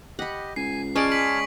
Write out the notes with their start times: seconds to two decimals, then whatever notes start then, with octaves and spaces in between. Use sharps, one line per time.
0.19 G4 D#5 F#5 B5
0.56 C#2 G#5 C7
0.96 G#3 C#4 C#5 D5 A5 C#6 F6 D7
1.12 B6 D7 F#7